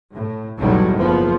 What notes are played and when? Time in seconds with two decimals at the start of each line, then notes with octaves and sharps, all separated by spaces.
0.14 A2
0.60 B1 E2 A2 D#3 F#3 G3
0.96 F#1 F3 B3